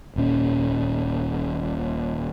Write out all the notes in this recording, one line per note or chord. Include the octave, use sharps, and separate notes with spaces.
D#1 A#2 C#4